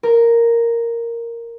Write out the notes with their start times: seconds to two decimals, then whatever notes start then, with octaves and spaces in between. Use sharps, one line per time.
0.03 A#4